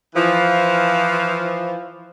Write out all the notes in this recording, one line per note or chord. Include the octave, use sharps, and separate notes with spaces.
E3 F3